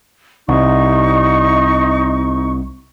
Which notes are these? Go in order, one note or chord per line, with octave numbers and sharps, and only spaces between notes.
C2 D#4 C#6